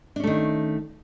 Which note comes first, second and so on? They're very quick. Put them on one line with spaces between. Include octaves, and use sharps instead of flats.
D4 C#4 A3 D#3